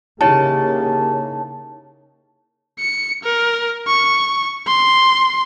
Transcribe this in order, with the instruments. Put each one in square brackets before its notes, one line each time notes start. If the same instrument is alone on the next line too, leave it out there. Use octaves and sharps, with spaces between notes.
[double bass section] C#3 A#3 [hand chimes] D#4 E4 C#5 [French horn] G4 [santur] A5
[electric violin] C#7
A#4
C#6
C6